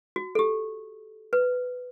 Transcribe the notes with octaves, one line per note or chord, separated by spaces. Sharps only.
F#4
A4
G4
B4